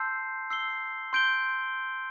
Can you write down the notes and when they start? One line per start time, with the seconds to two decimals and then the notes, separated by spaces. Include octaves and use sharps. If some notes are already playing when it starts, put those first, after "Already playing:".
Already playing: A5 C6 E6 G6 C7
0.50 E6 C7 G7
1.13 C6 G6 D7 G7